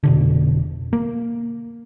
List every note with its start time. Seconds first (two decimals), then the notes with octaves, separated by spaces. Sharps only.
0.03 F1 B2 D3
0.93 A#3